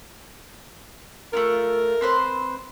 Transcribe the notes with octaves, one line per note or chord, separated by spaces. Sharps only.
A3 C4 F4 A#4
C4 B4 C5